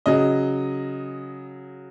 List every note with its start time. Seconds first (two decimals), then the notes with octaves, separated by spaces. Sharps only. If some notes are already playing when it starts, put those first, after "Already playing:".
0.06 C#3 F#3 D#5